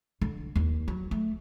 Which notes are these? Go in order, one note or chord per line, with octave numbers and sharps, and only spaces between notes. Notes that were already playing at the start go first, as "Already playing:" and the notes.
D3
D#2
F#3
A3